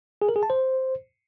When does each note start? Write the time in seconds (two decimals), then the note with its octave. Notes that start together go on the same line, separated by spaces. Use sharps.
0.22 G#4
0.29 A#4
0.36 G#4
0.43 A5
0.50 C5